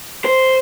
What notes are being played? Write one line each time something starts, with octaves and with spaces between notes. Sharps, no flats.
C5